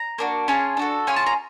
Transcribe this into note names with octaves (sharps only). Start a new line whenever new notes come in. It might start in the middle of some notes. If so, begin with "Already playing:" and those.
Already playing: A#5
A#3 D4 F#4
C#4 F4 G#4 A5
D4 F#4 A4
C#4 F4 G#4 G#5
A5
A#5